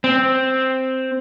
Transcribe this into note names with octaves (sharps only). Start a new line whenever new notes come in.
C4